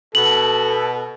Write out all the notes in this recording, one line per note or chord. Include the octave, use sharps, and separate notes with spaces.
B2 A4 F#7